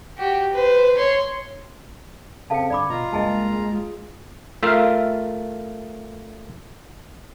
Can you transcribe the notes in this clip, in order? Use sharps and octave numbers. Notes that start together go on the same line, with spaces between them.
F#4 G4
B4 C5
C#5 C6
C#3 C4 A4 F5 A5 C#7
G2 D3 D5 B5 D6
B2 F4 D#5 A#5
C#2 G2 G#3 A#3 D#5 G#5 A5
F4 G#4
A3 F4 A#4 E5 F5